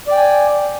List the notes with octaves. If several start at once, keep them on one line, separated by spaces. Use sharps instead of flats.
D5 G5 G#5